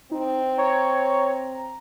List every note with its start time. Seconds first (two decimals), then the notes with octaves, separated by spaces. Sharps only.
0.11 C4 D#4
0.58 C#5 A#5